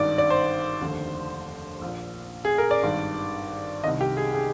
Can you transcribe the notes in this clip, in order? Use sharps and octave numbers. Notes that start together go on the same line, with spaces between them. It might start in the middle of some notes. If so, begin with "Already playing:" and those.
Already playing: G#1 G2 D#3 D5
D5
C5
F1 D#2 D3
A#1
A#2
G#4
A#4
D5
G#1 G2 D#3
C2 C3 D#3 D#5
G4
G#4
G#4